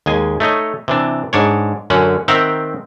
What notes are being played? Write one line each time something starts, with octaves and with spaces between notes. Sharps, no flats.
D#2 G#3 G#5
A3 D#4 C#5 D#5
C3 E3 D4
G#2 D4 C#5
F#2 D3 C#4 F#5
D#3 C4 E5 F#5 G5 A#5